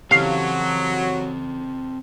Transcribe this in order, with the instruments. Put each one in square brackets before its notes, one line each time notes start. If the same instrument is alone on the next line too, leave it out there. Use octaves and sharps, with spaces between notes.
[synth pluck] C#3 E3 G4 [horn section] F#3 [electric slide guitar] C4 A4 [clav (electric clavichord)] F5